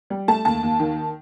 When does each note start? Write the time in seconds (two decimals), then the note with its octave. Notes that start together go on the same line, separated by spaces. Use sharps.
0.10 G3
0.28 A3 A5
0.45 D#2 A5
0.63 D#2
0.80 D#3